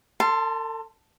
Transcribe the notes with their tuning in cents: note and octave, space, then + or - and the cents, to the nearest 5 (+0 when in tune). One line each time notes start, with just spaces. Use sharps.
A4 +40 A5 +0 C6 +0